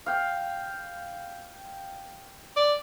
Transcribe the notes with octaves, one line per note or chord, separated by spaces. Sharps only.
F5 G5
D5